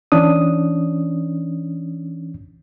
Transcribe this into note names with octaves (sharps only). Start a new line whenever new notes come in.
E3 C#4 D4 D#6